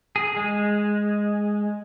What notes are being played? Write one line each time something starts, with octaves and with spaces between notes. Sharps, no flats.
G#4
G#3